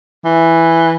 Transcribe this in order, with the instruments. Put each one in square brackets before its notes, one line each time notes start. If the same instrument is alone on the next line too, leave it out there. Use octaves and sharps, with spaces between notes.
[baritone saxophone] E3